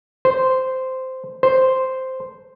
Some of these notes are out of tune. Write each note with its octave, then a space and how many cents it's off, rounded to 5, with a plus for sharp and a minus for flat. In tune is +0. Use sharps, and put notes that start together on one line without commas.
C5 -10
C5 -5